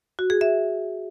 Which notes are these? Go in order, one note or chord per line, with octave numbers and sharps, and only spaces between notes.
F#4
G#4
E5